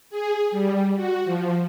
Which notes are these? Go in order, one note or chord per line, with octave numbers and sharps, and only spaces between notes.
G#4
G3
F#4
F3